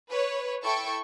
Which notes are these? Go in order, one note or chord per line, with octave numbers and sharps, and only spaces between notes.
B4 C#5
E4 A4 G5 C#6